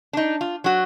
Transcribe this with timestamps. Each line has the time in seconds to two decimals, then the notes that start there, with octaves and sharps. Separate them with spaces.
0.13 D4 D#4
0.41 F4
0.64 F#3 F#4